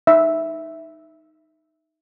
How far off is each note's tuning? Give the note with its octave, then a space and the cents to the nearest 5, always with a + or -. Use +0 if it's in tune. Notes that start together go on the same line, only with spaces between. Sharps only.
D#4 +0 E5 +0